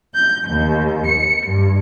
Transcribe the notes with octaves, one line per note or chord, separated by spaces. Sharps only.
G6
D#2
C#7
G2